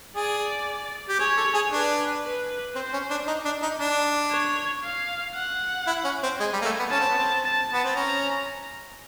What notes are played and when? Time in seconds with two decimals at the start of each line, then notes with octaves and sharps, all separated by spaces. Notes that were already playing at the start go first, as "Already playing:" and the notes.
0.16 G#4 D5
1.09 G4
1.20 G#4 C#5
1.37 A4
1.54 G#4
1.71 D4 B4
2.23 B4
2.75 C4 C5
2.93 C#4
3.10 D4
3.27 D#4
3.45 D4
3.62 D#4
3.80 D4
4.31 C#5
4.83 F5
5.35 F#5
5.87 E4
6.04 C#4
6.23 C4
6.40 G#3 G#5
6.53 G3
6.62 A#3
6.65 A3
6.79 B3
6.91 C#4 A5
7.00 C4
7.09 B3
7.18 C4
7.43 A5
7.73 B3
7.84 C4
7.95 C#4 A#5